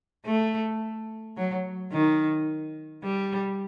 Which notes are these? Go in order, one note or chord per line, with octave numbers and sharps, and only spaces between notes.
A3
F#3
D#3
G3